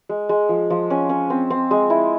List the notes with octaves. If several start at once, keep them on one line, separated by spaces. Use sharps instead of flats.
G#3
G#3
F3
F3
C#4
C#4
C4
C4
G#3
E4